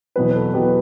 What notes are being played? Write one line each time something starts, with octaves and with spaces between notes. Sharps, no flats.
E2 B2 F#3 B3 B4
A4
E2 B2 F#3 B3 G4